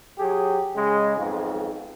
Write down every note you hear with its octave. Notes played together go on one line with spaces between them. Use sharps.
F#3 G4 G#4
C#3 G#3
B1 F2 G#2